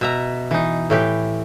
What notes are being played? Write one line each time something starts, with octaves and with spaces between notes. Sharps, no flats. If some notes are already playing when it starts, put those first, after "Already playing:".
B2 E5 A#5
E3 D#4
A2 E3 G4